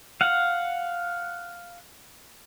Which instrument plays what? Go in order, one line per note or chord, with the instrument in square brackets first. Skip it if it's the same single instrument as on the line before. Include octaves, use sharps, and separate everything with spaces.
[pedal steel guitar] F5 F#5